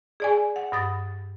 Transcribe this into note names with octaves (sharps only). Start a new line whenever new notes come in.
G#4 D5 G#5
F#5
G2 D#6 A6